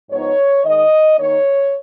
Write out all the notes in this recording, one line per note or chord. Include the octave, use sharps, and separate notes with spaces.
G#2 F3 B3 D#4 C#5
D#3 G#3 D#4 D#5
D#3 A#3 D#4 C#5